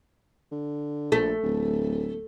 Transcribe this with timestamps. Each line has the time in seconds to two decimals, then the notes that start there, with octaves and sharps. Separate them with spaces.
0.52 D3
1.12 A#1 A3
1.43 D1